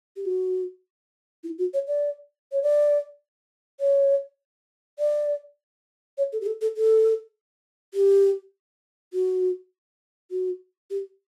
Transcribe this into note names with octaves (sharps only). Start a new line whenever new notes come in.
G4
F#4
E4
F#4
C#5
D5
C#5
D5
C#5
D5
C#5
A4
G4
A4
A4
A4
G4
F#4
F#4
G4